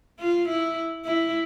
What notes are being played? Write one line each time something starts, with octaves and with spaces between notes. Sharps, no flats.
F4
E4
E4